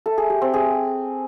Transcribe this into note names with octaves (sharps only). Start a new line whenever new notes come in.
A4
G#4
G4
C4
G#4